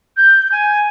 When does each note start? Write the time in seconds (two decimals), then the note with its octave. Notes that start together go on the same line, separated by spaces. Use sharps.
0.17 G6
0.52 G#5